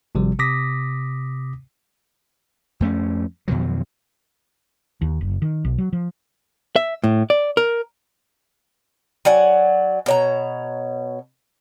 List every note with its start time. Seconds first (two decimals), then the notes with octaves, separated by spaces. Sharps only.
0.15 G#1 C3 F3 G3
0.39 C3 D6 D#6 A#6 B6
2.80 F2 A3 C#4
3.48 F2 B2 D#3 F#3
5.01 D#2
5.21 F#1
5.42 D#3
5.65 B1
5.78 F#3
5.93 F3
6.76 E5
7.04 A2
7.30 D5
7.57 A#4
9.25 F#3 D5 F#5 G#5
10.06 B2 C#5 A#5